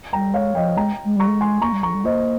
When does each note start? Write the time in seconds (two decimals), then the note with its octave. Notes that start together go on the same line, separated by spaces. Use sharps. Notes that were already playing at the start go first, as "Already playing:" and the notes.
0.13 G3 G5 A#5
0.34 G#3 C#5 F5
0.55 F3 D#5 G5
0.77 G#3 G5 A#5
1.05 G#3
1.16 G3 A#5 C#6
1.27 G#3
1.41 G#5 C6
1.62 A#3 A#5 C#6
1.73 G3
1.83 F3 A#5 C#6
1.94 G3
2.05 A#3 C5 D#5